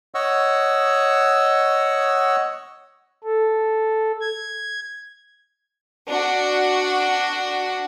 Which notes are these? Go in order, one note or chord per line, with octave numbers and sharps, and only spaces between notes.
C#5 D#5 F#5 C#6 E6
A4
G#6
D4 F#4